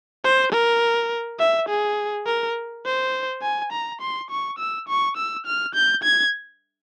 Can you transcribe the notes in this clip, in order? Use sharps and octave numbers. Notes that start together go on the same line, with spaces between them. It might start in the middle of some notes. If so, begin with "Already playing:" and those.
C5
A#4
E5
G#4
A#4
C5
G#5
A#5
C6
C#6
E6
C#6
E6
F6
G6
G#6